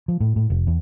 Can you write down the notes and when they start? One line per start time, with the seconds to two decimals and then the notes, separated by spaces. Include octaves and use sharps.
0.08 F3
0.21 A2
0.36 A2
0.50 F1
0.67 E2